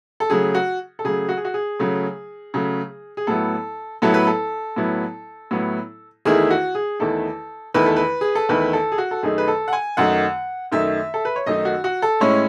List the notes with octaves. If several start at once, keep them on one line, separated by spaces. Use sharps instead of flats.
A4
C#3 F#3 A3 G#4
F#4
A4
C#3 F#3 A3 G#4
F#4
G#4
F#4
G#4
C#3 F#3 A3
C#3 F#3 A3
G#4
A2 F#3 B3 E4 A4
A2 F#3 B3 E4 A4
B4
A4
A2 F#3 B3 E4
A2 F#3 B3 E4
E2 D#3 A3 E4 G#4
F#4
G#4
E2 D#3 A3 E4 A4
E2 D#3 A3 E4 B4
A4
B4
G#4
A4
E2 D#3 A3 E4 B4
A4
G#4
F#4
A4
F#2 D#3 A3 D#4 G#4
B4
A4
F#5
G#5
F#2 D#3 A3 D#4 F#5
F#2 D#3 A3 D#4 E5
A4
B4
C#5
F#2 D#3 A3 D#4 D#5
F#4
F#4
A4
A2 G#3 C#4 E4 C#5